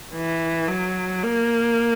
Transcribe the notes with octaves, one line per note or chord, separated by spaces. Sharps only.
E3
F#3
A#3